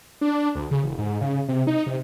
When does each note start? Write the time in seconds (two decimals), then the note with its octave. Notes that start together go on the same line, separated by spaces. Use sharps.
0.21 D4
0.55 D2
0.71 C#3
0.84 E1
0.98 G#2
1.21 C#3
1.48 C3
1.67 D#4
1.86 C3